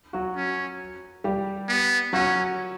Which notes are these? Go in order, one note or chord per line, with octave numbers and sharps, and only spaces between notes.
F#3 F#4
C#4
G3 G4
B3
F#3 C#4 F#4